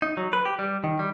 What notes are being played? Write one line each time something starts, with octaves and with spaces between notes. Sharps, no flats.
D#4
F#3
B4
G4
G3
D#3
G3